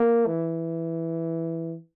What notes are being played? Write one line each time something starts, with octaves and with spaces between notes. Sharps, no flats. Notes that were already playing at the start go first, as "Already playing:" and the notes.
Already playing: A#3
E3